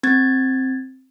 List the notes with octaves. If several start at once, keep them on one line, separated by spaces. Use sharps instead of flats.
C4 G#6 A6